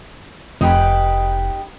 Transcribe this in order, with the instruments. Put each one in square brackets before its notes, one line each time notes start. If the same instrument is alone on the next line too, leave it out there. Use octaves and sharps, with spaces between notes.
[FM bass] F1 [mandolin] D#4 G4 B4